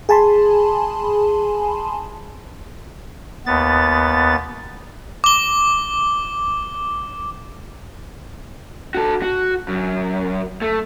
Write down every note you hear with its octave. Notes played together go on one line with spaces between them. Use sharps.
G#4 G#5 A5 B5 C6
D#2 B3 A6
D6 G7
F#4 A4
F#4
F#2
A3